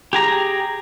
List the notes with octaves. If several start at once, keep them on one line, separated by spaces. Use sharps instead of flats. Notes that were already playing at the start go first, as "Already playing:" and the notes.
G4 G#4 A#5